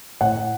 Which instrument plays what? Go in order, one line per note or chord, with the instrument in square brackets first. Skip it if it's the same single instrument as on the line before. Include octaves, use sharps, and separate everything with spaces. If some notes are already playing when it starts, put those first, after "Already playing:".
[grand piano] A2 F#5